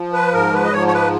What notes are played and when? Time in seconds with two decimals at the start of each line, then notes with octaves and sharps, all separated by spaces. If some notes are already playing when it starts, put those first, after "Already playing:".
Already playing: F3
0.13 B4
0.33 G#2 A#4
0.53 B4
0.64 D#5
0.72 F3 C#5
0.87 C#5
0.93 B4